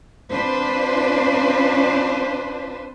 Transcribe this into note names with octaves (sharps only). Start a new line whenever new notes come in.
C4 D4 F4 B4 C5